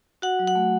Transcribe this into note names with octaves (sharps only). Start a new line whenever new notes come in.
F#4 F#5
F#3
F#5
A3